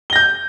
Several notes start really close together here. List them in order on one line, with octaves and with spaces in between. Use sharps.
G7 A#6 G6